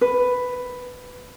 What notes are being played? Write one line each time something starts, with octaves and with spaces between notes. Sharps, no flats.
B4